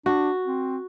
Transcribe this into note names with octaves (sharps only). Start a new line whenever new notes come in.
D4 F#4
C4